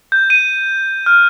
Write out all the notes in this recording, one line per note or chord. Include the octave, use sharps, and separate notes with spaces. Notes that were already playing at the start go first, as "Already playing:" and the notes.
G6
D#7
F6